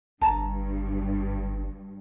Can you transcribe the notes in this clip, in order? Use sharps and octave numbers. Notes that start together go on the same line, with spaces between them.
G1 G2 A5 A#5